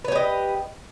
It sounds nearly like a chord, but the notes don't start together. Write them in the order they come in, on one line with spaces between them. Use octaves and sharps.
B4 C#5 G4 D#5